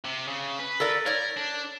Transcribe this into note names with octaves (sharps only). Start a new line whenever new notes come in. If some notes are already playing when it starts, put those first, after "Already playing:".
C3
C#3
B4
A4 A#4 D5
A#4 C#5 D5
D4